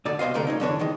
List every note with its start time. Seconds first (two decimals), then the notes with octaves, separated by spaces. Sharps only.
0.05 G#2 D3 D5
0.19 C2 B2 C5 D#5 F5
0.34 C2 D3 A3 A#4
0.47 A#2 C#4 D#4
0.60 E2 G2 D3 E3 D4 C#5
0.79 D#3 E3 G#3